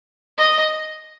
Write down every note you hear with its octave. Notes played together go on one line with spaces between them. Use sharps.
D#5